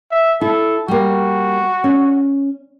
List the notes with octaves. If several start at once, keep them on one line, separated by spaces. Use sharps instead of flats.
E5
E4 A4
G3 A#3 F#4
C#4